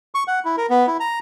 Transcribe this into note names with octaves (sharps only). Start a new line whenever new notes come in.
C#6
F#5
E4
A#4
B3
E4
A#5